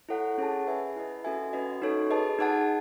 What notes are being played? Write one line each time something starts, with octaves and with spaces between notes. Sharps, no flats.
E4 A4 C#5 F#5
C#4 G#4 C#5 F#5 A5
G#4 B4 E5 G#5
E4 B4 D#5
C#4 F#4 A4 E5 G#5
C#4 F#4 B4 D#5
D#4 F#4 A4 C#5
G#4 B4 D#5 A5
D#4 G#4 D#5 F#5 A5